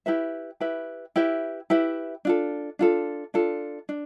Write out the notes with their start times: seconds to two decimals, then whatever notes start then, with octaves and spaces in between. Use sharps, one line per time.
0.06 E4 G4 B4 E5
0.60 E4 G4 B4 E5
1.16 E4 G4 B4 E5
1.70 E4 G4 B4 E5
2.25 D4 F4 A4
2.79 D4 F4 A4
3.34 D4 F4 A4
3.89 D4